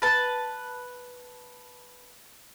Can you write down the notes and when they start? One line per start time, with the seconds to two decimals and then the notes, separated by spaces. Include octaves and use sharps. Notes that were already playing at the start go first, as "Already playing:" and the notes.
0.02 B4 A5